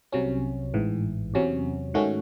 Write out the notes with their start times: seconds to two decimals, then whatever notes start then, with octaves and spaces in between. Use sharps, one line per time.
0.12 C2 C3 F#3 C#4
0.74 A1 G#2 E3
1.34 E2 C3 F#3 C#4
1.94 G#2 D#3 A3 C#4 F#4